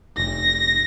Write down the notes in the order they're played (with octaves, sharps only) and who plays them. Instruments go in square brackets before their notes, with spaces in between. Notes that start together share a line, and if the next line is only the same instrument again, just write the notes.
[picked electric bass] F1 [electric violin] A#6